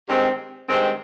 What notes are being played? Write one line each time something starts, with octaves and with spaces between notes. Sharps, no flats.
G2 D#3 G#3 C4
G2 D#3 G#3 C4